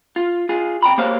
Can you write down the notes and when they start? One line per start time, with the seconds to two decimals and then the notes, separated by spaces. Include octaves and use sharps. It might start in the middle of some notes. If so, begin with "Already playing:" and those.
0.16 F4
0.49 F4 G#4
0.82 C3 G5 A#5 B5
0.98 A#3 G4 C5 C#5 F5